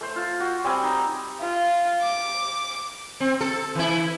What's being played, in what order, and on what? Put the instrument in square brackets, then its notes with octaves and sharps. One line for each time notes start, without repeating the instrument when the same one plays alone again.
[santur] A3 C5
F4
F#4
G3 C4 G#5
D#4
[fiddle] F4
D6
[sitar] C4
A4
E3 E4